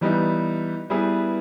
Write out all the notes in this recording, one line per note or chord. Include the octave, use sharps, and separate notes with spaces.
E3 G3 B3 D#4
G3 B3 E4 G#4 B4